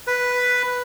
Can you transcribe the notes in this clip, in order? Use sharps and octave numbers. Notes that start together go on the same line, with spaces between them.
B4